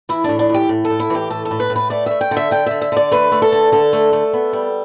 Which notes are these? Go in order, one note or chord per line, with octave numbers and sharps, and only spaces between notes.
E3 E4
A2 D4
D4
E3
G4
A2
A4
A2
E4
E3 G4
A2 A4
A4
A2
B4
A2
B4
A3 D5
A3 E5
G5
D3
E5
D3 G5
D3 E5
E5
D3 D5
A3 B4
A3
A4
D3
D3 A4
A3
A3
B3
G3